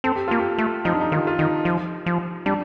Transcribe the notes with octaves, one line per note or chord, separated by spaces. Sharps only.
C4 A4
G4
A#3 F4
G4
A3
F3 D#4
D4
D#4
D#3 F4
F4
D#3 D#4
F3
F3
G3 D4